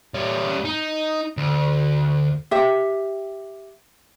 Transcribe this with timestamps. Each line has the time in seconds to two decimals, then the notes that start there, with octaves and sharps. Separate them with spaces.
0.14 G3 C#4
0.65 D#4
1.37 D2
2.51 G4 E5